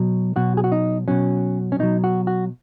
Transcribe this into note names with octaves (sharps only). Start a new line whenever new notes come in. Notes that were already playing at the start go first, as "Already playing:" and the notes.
Already playing: B2 F#3
B2 F#3 F#4
G#4
F#4
D#4
B2 F#3 C#4
C#4
B2 F#3 D#4
F#4
F#4